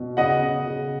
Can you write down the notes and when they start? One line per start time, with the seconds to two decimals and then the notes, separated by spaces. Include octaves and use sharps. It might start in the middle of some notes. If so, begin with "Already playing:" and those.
Already playing: B2
0.17 C#3 D#5 F#5
0.42 C#3
0.67 C#3